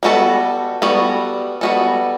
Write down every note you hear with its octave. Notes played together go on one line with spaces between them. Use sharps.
G3 B3 F#4 A4
G3 B3 F#4 A4
G3 B3 F#4 A4